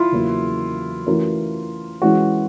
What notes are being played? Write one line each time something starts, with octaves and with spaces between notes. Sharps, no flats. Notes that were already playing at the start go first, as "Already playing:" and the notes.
Already playing: E4 F4
E2 C#3 F#3 A#3 C#4
E3 A3 C#4 F#4 A#4
E3 G#3 C#4 F#4